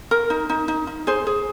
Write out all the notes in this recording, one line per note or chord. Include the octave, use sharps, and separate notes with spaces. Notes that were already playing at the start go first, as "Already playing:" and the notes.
A#4
D#4
D#4
D#4
D#4
G#4 C5
G#4